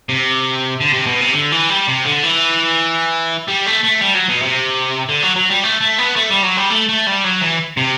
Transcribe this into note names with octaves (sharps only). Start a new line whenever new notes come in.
C3
D3
C3
B2
C3
D3
E3
G3
C3
D3
E3
G3
A3
A3
G3
F#3
B2
C3
D3
F#3
F#3
G3
A3
A3
B3
A3
G3
F#3
G3
A3
A3
G3
F#3
E3
C3